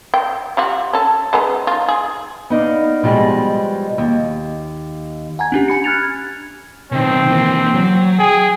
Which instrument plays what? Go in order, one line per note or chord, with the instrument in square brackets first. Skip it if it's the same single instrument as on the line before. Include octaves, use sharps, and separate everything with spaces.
[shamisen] G5
G3 F4 F#4
C#4 A4
G#3 B3 D#4
D#4 F4
G#4
[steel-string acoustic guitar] B3 D#4 D5 F5
B2 F3 G3 G#3
D#2
[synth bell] F#5 G#5 A#5 G#6
C#4 D4 G4
G#5 B5 C#7
F6 F#6 G#6 A6 C#7 F7
G#6
[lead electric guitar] B2 D#3 [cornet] C4
[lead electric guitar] E3 A#3
F#3
[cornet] G#4 [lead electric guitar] G5